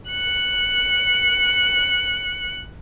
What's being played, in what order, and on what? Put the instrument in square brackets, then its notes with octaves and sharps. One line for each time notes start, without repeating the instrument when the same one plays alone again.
[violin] F#6 C#7